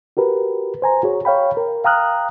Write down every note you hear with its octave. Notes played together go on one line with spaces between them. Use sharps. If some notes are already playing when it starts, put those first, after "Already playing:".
F#4 G4 A#4 B4
C5 G#5 A#5
F#4 G#4 C#5
C#5 F5 G5 B5
A#4
F5 G5 A#5 D#6 F6 F#6